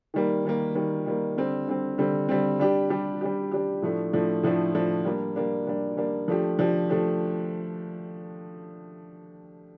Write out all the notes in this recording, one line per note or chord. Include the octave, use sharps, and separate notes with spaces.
D#3 G3 A#3
D#3 G3 A#3
D#3 G3 A#3
D#3 G3 A#3
D3 G3 C4
D3 G3 C4
D3 G3 C4
D3 G3 C4
G3 D4 G4
G3 D4 G4
G3 D4 G4
G3 D4 G4
A2 F3 A3 D4
A2 F3 A3 D4
A2 F3 A3 D4
A2 F3 A3 D4
G3 A#3 D4
G3 A#3 D4
G3 A#3 D4
G3 A#3 D4
F3 A3 D4 G4
F3 A3 D4 G4
F3 A3 D4 G4